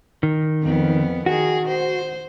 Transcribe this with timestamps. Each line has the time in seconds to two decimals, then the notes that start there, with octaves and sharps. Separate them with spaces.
0.23 D#3
0.62 F2 B3
1.26 D#3 F#4 G#4
1.68 C5